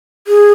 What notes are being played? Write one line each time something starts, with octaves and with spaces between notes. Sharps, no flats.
G#4